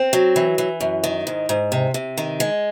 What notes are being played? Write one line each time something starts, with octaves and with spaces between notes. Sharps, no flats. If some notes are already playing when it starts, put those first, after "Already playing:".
Already playing: C4
F#3
E3
E3
F#2
D#3
G#2
G#2
C3
C3
D#3
G#3